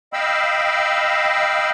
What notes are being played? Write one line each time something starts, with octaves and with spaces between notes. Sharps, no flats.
D#5 F5 G5 B5 E6